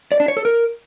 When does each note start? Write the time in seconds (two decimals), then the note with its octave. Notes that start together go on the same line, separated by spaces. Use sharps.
0.12 D5
0.20 D4
0.28 C#5
0.37 A4
0.45 A#4